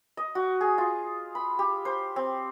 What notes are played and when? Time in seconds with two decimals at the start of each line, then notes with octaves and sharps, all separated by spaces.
0.17 D#5
0.35 F#4
0.61 G#4
0.78 F4
1.35 B5
1.59 G4
1.85 C5
2.16 C4